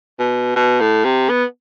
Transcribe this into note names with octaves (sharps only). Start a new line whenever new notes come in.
B2
B2
A2
C3
B3